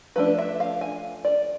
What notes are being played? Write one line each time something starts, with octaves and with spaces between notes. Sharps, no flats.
F3 A3 D4 B4
E5
F5
G#5
D5